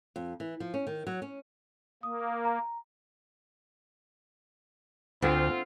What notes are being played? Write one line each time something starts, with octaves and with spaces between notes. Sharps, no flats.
F2
E3
F3
C#4
D#3
F#3
C#4
A#3 D#6
A#5
D2 C4 F4